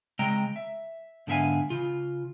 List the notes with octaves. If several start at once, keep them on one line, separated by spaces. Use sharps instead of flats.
C#3 G#3 C4 D#5 G5 A#5
E5
G#2 D3 B3 E5 F5 G#5
C#3 F4